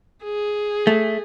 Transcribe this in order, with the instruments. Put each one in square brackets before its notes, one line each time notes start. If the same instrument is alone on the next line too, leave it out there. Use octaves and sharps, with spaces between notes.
[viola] G#4
[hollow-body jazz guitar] A3